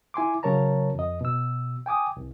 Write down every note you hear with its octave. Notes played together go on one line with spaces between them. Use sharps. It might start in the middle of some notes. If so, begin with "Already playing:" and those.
E4 G#5 C6 D6
C#3 F#3 A#4 C#5 A5 A#5
F2 D#5
B2 E6
G5 G#5 D6 D#6
C2